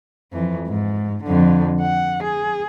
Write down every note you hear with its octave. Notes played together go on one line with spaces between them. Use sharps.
F2 E3
G#2
F2 D3
F#5
G#4